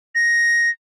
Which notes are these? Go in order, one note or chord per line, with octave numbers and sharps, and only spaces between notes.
A#6